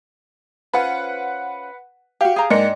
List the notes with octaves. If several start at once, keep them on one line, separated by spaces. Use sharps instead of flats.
C#4 F4 B4 C5 F#5
F#4 G4 F5
G#4 F5 A#5
G#2 A#3 D4 D#5 G5 C#7